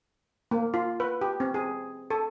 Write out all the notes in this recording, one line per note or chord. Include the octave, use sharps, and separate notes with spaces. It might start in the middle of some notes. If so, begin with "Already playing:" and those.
A#3
F4
B4
G4
C4
G#4
A4